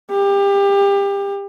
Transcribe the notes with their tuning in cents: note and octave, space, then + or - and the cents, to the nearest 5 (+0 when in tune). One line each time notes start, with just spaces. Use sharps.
G4 +30